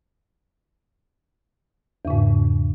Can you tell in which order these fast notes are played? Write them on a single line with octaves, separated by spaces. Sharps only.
E2 C#3 G#2